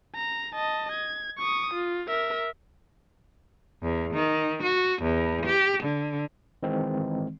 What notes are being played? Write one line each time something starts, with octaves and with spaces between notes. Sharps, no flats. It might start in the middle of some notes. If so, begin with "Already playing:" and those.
A#5
D#5 A5
G#6
C#6 D#6
F4
A#4 E5
E2
D#3
F#4
E2
G4
D3
D#3 E3 G#3 C4